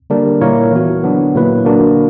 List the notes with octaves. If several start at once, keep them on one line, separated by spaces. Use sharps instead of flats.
D3 G3 A#3 D4 A#4
A#2 A#3 E4 A#4 C#5
E3 B3 F#4
D3 F#3 B3 D4
A#2 F#3 A#3 E4 B4
D3 A#3 D4 F#4 A#4